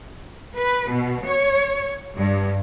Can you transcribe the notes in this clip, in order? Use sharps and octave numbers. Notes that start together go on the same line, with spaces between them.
B4
B2
C#5
G2